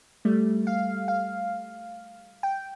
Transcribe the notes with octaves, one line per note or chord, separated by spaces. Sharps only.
G3 A3
F5
F5
G5